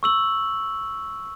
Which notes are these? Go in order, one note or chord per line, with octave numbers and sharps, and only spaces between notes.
C#6 E6 F#7